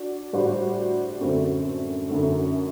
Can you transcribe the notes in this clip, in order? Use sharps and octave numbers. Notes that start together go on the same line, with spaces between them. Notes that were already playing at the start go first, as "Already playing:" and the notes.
Already playing: D4 F#4
A2 G3 D4 F#4 C5
F#2 D3 A3 C4
F#2 D3 A3